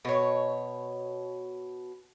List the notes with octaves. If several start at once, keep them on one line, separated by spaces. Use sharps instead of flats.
B2 C#5